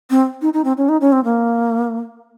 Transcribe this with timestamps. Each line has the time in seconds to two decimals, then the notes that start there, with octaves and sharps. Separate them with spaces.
0.10 C4
0.42 D#4
0.53 D#4
0.64 C4
0.77 C#4
0.89 D#4
1.01 C#4
1.12 C4
1.24 A#3